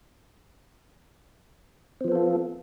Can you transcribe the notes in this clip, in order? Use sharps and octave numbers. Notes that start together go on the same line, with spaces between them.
F3 B3 C4 F4 A4